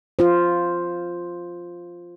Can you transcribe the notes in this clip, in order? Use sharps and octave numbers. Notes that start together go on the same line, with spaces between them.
F4 C5